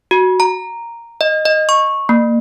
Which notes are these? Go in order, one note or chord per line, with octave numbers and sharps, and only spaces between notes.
F#4
A#5
D#5
D#5
C#6
A#3